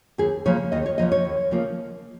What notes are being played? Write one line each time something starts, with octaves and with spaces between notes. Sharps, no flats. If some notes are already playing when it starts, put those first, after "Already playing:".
D#2 G#4
C#3 F3 A#3 C#5
D#2 D#5
C#5
C#3 F3 A#3 D#5
C#5
D#2
C#3 F3 A#3